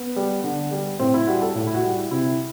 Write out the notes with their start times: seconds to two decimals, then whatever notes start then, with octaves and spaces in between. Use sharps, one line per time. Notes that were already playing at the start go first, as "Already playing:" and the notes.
Already playing: B3
0.16 G3
0.44 D3
0.71 G3
0.99 A2 C4
1.14 E4
1.27 G3 F#4
1.42 A4
1.55 A2
1.67 E4
1.75 F#4
1.83 G3
1.93 E4
2.11 C3 E4